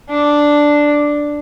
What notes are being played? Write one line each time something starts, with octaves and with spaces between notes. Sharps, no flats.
D4